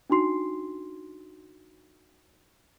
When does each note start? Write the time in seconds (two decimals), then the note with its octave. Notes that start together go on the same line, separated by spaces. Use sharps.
0.10 D4 D#4 F#4 C6 C7